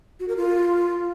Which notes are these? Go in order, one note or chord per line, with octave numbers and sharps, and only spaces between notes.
F#4
A#4
F4